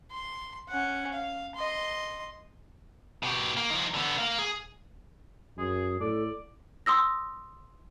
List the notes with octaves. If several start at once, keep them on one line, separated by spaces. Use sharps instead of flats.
C6
C#4 F#5
F5
D#5 C6
B2 G4
A#3
F3 D#4
D3 B3
A#4 F5
G#4
F#2 G#4
A2 A4 D5
C6 D#6 E6 A#6